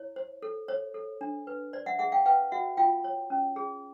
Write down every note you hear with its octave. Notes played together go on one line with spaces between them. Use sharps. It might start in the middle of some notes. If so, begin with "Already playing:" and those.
Already playing: E4 C#5
C5
A4
C5 C#5
A4
D4
B4
C5 D5
E5 F#5
G#4 E5 F#5
F5 G5
B4 F5 G5
F#4 E5 F#5
F4 F5 G5
C#5
C#4
G#4